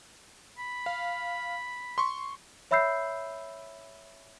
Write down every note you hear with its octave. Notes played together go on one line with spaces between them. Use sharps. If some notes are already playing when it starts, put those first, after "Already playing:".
B5
F5
C6 C#6
C#5 E5 B5 E6 G6 C7